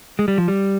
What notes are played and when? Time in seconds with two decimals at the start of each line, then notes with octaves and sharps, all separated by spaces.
0.19 G#3
0.28 G3
0.38 F3
0.48 G3